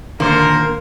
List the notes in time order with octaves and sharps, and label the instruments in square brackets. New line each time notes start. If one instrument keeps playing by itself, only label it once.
[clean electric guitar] D#2 A#2 C5 [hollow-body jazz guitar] D3 [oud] A#3 [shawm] A#4